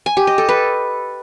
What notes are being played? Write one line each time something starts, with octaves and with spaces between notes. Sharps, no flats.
G#5
G4
D#5
A4
B4